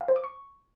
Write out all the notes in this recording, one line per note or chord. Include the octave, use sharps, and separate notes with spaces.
F5
C5
D6
C#6